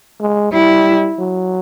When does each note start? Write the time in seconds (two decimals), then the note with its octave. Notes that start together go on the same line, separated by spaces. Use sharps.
0.20 G#3
0.52 G3 E4
1.19 F#3